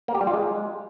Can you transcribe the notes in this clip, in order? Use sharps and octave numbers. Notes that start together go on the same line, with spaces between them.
A#3
G4
G3
F4
G#3